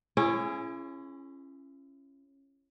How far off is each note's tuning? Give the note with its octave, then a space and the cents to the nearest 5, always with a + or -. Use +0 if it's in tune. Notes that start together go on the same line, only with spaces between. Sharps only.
C#4 -15 E4 +40 G#4 +20